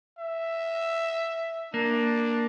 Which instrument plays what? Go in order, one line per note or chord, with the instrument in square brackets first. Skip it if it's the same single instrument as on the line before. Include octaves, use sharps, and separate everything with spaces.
[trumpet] E5
[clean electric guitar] A#3 [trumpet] D4